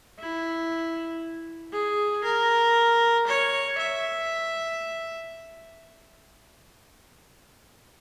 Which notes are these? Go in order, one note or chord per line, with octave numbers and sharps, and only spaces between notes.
E4
G#4
A#4
C#5
E5